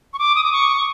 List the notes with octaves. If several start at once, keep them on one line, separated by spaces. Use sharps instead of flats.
C#6
D6
D#6
D6
C#6